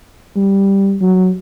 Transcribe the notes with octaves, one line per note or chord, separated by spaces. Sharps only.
G3
F#3